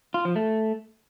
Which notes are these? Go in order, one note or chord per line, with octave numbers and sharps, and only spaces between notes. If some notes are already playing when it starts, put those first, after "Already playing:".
F4
F3
A3